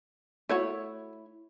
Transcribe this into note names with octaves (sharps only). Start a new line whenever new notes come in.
A3 E4 F#4 C#5